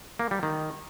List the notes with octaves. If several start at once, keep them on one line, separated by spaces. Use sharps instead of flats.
A#3
G3
D#3